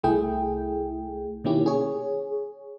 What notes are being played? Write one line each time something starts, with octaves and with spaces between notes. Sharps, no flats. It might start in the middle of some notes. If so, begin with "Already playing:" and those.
C2 A3 E4 G#4 G5
B2 D#3 A#3 C#4 E4 G4
G#4 C#5